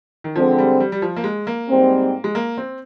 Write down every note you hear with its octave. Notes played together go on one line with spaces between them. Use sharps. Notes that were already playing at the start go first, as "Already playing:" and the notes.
D#3
D3 F3 G#3 C4
G3
G3
G3
F3
A#3
G#3
A#3
G#2 G3 C4
G#3
A#3
C4